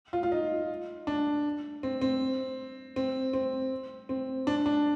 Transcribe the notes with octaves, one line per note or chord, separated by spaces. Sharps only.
F4
F4
D#4
D4
C4
C4
C4
C4
C4
D4
D4